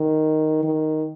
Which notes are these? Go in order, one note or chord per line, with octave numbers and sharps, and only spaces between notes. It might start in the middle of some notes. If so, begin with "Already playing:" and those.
Already playing: D#3
D#3